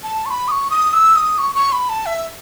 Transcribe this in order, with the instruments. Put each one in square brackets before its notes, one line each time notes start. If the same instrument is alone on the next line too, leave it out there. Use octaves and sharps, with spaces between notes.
[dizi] A5
C#6
B5
D#6
C#6
D#6
E6
D#6
C#6
C#6
B5
A5
E5